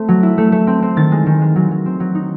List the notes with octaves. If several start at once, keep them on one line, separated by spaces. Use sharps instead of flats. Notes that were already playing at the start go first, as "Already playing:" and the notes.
Already playing: A3 C4
F#3
E4
A3
A3
C4
C4
D#3 A6
G#3
D#3
G#3
F#3
F#3
C4
F#3
D#4